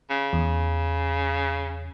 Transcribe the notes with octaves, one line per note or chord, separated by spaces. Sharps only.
C#3
E2